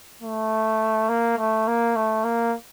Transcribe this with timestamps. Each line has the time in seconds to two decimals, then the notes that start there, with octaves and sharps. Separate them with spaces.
0.22 A3
1.09 A#3
1.38 A3
1.67 A#3
1.96 A3
2.24 A#3